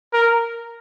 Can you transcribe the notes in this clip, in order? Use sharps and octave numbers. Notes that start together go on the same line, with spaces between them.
A#4